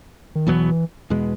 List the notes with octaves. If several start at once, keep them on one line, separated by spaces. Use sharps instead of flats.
D#3
E2 B2 E3 F#3 B3
E2 B2 G#3 B3